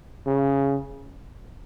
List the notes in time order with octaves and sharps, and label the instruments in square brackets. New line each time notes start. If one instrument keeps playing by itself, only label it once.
[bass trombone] C#3